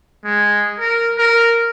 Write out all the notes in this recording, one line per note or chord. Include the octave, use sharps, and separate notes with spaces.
G#3
A#4
A#4